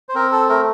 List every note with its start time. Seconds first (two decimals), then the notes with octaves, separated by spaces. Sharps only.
0.09 C5
0.15 C4 A#4
0.32 A4
0.49 A3 A#4